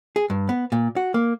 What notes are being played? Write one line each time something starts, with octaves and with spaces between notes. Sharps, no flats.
G#4
G2
B3
A#2
F#4
A#3